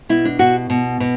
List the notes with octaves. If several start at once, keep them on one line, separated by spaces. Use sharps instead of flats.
B2 E4
D4
B2 F#4
B2
B2